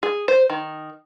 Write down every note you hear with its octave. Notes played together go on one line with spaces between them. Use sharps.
G#4
C5
D#3